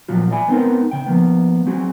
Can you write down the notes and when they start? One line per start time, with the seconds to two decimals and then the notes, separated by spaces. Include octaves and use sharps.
0.08 A#2 F3 F#3 F4 F#4
0.31 D5 E5 G#5 B5
0.48 B3 C4 D#4 A#4
0.91 C#3 G5
1.06 F3 A#3 B3
1.66 F#3 C4 F#4 G#4